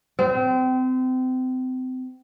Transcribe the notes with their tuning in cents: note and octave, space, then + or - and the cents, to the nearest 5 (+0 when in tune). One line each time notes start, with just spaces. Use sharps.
C4 -30